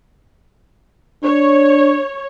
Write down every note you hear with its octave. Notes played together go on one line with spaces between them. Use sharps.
D4 C#5